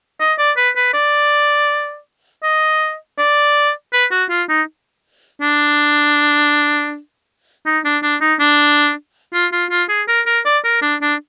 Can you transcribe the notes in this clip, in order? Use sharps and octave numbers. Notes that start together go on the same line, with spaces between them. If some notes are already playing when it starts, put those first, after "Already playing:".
D#5
D5
B4
B4
D5
D#5
D5
B4
F#4
F4
D#4
D4
D#4
D4
D4
D#4
D4
F4
F4
F4
G#4
A#4
A#4
D5
A#4
D4
D4